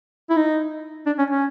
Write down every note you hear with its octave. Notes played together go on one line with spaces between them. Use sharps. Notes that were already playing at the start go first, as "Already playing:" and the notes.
E4
D#4
D4
C#4
C#4